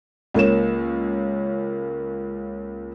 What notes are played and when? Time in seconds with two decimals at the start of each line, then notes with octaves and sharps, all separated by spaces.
0.34 C#2 A#3 C#5 E7